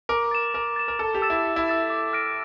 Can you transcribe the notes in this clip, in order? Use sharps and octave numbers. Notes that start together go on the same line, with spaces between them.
A#4 D6
A6 E7
A#4 D6
A6 E7
A#4
A4 A5
G4
E6 A6 E7
E4
A5
E4
E6 A6 E7
D6
F6 A#6 D7